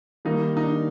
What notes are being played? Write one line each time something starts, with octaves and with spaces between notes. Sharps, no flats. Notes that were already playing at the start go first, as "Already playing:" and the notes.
D#3 G3 A#3 D#4
D#4
D4